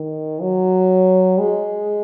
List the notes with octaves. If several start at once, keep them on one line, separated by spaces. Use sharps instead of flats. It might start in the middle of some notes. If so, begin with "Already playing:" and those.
Already playing: D#3
F#3
G#3